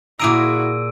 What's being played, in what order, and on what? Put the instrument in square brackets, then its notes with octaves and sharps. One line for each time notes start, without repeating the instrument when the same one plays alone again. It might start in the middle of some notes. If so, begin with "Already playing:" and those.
[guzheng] A#2 G#4 A#5 [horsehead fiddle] E4 F#4 [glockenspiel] E6 D7 D#7